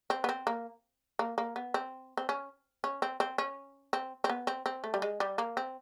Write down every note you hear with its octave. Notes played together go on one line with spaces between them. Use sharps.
C4
B3
C4
A#3
A#3
A#3
B3
C4
C4
C#4
C#4
C4
C4
C#4
C4
C4
B3
C4
C4
A3
G3
G#3
G3
A#3
C4